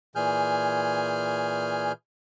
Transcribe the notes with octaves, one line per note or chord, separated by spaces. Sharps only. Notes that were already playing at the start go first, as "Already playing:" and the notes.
A#2 E3 G#4 G#5 F6 G6